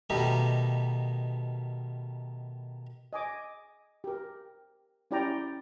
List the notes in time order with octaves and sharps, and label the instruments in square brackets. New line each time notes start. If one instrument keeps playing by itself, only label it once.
[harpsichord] B2 D#3 G3 A3 D#4 G4
[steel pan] D#5 G#5 D6
G4 A#4
C#4 E4 G4 D5 G5 A#5